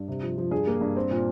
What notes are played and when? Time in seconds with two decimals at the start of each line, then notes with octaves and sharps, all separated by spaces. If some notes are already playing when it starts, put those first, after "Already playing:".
Already playing: G2
0.08 C3
0.23 F3
0.38 F3
0.51 G2 G#4
0.67 A#3
0.81 G2
0.97 C4
1.11 A#2